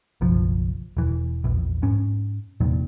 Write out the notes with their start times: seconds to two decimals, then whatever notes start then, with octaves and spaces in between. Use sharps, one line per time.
0.21 F#1 B1 F3
0.97 E1 E3
1.44 A#1 E2
1.83 G#2 C#4
2.61 F1 E2 A#2 D#3